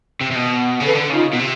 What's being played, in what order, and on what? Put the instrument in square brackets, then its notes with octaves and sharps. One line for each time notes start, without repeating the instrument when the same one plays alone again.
[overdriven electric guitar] C3
C3
B2
[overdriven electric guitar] C#3 [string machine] A4 B4
[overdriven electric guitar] D3
[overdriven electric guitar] C#3 [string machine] D#4 F4
[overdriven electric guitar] B2
C3